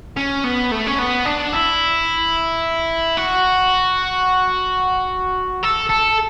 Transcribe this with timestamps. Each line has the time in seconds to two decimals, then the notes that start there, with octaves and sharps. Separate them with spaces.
0.16 C#4
0.44 B3
0.71 A3
0.87 C#4
0.99 B3
1.25 D4
1.53 E4
3.17 F#4
5.63 A4
5.90 A4